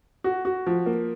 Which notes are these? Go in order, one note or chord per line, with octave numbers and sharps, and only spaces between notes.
F#4
F#4
F3
A#3